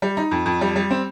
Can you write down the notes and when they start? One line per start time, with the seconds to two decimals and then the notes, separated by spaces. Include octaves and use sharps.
0.02 G3
0.17 D#4
0.31 F2
0.46 F2
0.61 G3
0.76 G3
0.91 C4